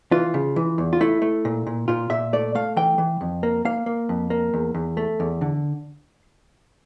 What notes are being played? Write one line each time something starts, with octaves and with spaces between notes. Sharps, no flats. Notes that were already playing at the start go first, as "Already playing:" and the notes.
E3 F4
C#3
E3
E2
F4
A3 E4
A3
A#2
A#2
A#2 F4
A#2 E5
A3 D5
A3 F5
E3 G5
E3
F2
A#3
A#3 F5
A#3
F2
A#3
E2
E2
A3
E2
D3